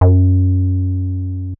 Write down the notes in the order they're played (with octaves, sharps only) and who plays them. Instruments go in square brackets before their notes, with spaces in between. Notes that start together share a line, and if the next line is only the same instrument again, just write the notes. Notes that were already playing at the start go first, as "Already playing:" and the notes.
[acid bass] F#2